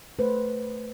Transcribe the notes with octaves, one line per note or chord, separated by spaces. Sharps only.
A3 B4 C5